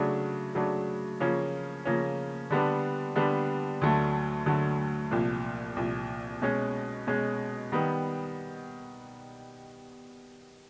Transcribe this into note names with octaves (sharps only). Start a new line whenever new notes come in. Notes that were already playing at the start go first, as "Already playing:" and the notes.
Already playing: C#3 F#3 A3 D4
C#3 F#3 A3 D4
C#3 F3 A#3 C#4
C#3 F3 A#3 C#4
D3 G3 B3 D4
D3 G3 B3 D4
D2 D3 F#3 A3
D2 D3 F#3 A3
C2 A#2 F3
C2 A#2 F3
B2 G#3 C#4
B2 G#3 C#4
D#3 G3 B3